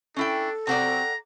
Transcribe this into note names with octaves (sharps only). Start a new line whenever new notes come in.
C#4 D4 E4 A4 G5
C3 F#3 C4 D5 F#5 G5 A#5